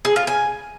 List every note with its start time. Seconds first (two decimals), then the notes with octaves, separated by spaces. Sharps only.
0.05 G#4
0.16 F4
0.27 G#5